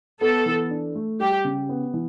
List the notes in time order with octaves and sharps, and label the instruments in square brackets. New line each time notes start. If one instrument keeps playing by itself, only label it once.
[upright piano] B3 [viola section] A4
[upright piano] E3
D4
A3
[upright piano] G3 [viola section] G4
[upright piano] C#3
B3
E3